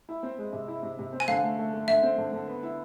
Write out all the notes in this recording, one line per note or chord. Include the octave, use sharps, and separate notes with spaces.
E4
C4
G#3
C3
E4
C3
C3
C4
G#5
D3 F5
A3
A3
A3
D3 E5
C4
D3
D3
B3
E4